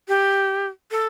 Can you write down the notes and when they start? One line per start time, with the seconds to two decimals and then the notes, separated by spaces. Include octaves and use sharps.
0.08 G4
0.91 A4